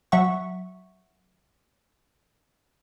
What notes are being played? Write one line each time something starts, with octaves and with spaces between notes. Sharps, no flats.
F#3 E5 F#5 C#6